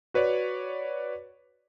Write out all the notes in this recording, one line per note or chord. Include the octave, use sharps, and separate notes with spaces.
F#4 B4 C#5 D5